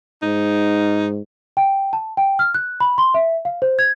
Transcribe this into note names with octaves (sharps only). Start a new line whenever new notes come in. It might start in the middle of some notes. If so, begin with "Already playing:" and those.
G#2 D#4
G5
A5
G5
F6
F#6
B5
C6
E5
F5
C5
G#6